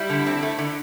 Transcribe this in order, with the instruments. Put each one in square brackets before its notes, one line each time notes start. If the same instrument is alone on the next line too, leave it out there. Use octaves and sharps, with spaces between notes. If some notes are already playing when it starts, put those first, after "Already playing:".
Already playing: [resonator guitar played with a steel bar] G3 [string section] E4
[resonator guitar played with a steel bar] D3
C4
A3
D3